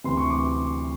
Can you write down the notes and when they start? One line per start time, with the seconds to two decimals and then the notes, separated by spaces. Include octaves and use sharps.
0.04 D2 C3 E3 C6
0.17 C#6
0.30 D6